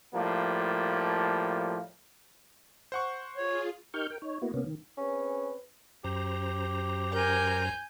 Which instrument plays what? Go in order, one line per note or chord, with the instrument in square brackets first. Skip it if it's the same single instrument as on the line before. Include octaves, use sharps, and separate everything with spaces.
[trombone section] A2 F3 G3 A#3
[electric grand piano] C5 F#5 C#6
[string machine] F4 G#4 [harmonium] C#5
[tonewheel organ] D#4 G4 A#4 C#6 F6 G6
A#4 G5
D#4 C#5
A#3 B3 E4 F#4
C3 A#3 B3 C#4
D#3
[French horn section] C4 G#4 B4 [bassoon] C#4
[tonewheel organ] F#2 C5 A#5 [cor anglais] G4
[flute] A#4 [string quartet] G#5 G6